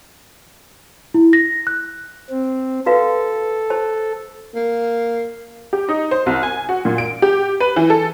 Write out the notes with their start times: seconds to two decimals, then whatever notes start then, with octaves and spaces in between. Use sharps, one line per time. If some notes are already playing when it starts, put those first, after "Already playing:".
1.14 E4
1.33 A#6
1.67 F#6
2.30 C4
2.86 F#4 A4 B4 F5
3.70 C5 A5
4.55 A#3
5.73 G4
5.89 D#4
6.11 C5
6.26 C2
6.43 G#5
6.69 F#4
6.85 A#2
6.98 D7
7.22 G4
7.60 B4
7.76 E3
7.90 A4